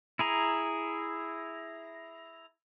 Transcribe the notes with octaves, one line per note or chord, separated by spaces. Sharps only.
E4 G#4 A#5